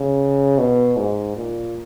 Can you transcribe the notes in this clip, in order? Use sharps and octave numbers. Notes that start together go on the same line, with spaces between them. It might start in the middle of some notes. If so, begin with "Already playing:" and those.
Already playing: C#3
B2
G#2
A#2